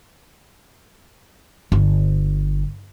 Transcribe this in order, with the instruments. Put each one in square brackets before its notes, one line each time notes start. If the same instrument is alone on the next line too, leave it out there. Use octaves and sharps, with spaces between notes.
[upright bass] G1